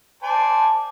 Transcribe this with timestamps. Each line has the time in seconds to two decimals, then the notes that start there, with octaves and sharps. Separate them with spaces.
0.23 C5 D5 G#5 A5